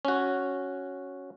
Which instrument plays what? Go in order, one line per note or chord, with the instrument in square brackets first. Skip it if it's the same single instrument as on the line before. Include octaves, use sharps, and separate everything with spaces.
[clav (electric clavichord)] C#4 F#4